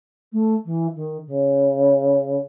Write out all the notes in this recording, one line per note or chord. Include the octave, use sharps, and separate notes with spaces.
A3
E3
D#3
C#3